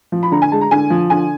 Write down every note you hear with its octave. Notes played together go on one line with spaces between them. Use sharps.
F3
B5
D3 A#5
G#5
G#3 A5
A#5
D3 G#5
F3
D3 G#5